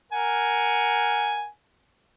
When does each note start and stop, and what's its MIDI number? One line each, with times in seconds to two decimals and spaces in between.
0.12 1.46 70
0.12 1.46 78
0.12 1.46 80